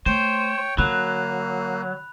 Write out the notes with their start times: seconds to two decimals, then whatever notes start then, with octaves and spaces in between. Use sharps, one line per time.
0.06 A3 C5 C#5 G5
0.78 D3 F#3 A#3 B5 F#6 F7